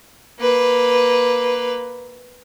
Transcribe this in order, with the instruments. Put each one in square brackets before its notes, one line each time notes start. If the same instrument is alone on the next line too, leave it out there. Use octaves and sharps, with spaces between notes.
[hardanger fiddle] A#3 B4